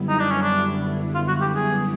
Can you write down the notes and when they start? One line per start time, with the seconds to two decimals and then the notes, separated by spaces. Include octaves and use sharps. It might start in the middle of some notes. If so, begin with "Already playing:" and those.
Already playing: F#2 D3 G3 B3 E4
0.09 D#4
0.19 D4
0.31 C#4
0.42 D4
1.15 F4
1.28 F#4
1.41 G4
1.55 G#4